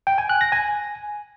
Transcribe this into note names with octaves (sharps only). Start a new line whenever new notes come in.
G5
G#5
F#6
A#6
G#5